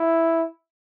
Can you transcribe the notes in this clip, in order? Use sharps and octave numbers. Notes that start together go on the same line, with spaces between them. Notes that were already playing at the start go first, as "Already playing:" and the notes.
Already playing: E4